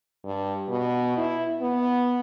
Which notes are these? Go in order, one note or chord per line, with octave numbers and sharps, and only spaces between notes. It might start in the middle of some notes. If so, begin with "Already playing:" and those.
G2
B2
E4
B3